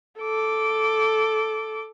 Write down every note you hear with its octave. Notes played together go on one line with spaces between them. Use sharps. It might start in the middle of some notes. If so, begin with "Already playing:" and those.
A4 D6